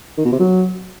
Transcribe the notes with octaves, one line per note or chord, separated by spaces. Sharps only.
D#3
B2
C3
F#3